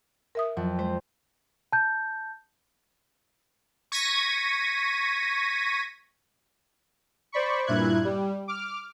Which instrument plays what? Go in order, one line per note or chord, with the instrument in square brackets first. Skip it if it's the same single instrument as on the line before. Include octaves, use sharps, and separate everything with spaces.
[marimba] A#4 E5 D#6
[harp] F2 [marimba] F#3
[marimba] G#3 [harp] C5
[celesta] A5 G6
[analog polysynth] C#6 G#6 A#6 B6 D#7
[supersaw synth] C5 D5 B5 C#6
G2 A#2 E4 F#6 G#6
G3
D6 F6